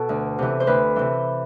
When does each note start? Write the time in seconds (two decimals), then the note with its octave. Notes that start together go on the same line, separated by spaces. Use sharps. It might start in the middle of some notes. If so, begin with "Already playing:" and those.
Already playing: B2 A4
0.09 D2
0.39 C3 E3
0.60 C5
0.67 D2 B4
0.96 C3 E3